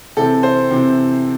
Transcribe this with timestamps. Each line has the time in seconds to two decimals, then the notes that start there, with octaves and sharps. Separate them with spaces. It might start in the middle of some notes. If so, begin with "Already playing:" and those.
0.17 C3 E3 C4 A4
0.43 C5
0.71 C3 E3 C4